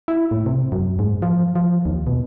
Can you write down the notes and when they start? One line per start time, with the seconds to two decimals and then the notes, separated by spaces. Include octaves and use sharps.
0.08 E4
0.31 A2
0.46 C3
0.72 F#2
0.99 G#2
1.22 F3
1.55 F3
1.86 D#2
2.07 B2